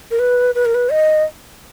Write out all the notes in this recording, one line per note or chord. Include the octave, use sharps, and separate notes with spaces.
A#4
B4
B4
A#4
B4
D#5